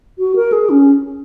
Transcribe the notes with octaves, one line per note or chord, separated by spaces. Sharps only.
F#4
A#4
G#4
C#4